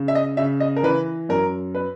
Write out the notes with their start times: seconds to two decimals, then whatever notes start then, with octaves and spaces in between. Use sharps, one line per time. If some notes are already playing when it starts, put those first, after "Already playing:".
Already playing: C#3
0.08 E5
0.15 D#5
0.37 C#3 E5
0.60 D#5
0.76 A#4
0.83 E3 B4
1.29 F#2 A#4
1.75 B4